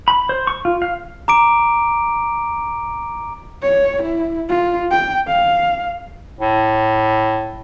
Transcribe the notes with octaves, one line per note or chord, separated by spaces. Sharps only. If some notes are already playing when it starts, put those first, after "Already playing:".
B5
C5
C#6
F4
F5
A#5 D6 D7
C#5
E4
F4
G5
F5
A2